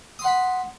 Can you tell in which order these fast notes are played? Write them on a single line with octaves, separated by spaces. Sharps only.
D#6 C6 F#5 B5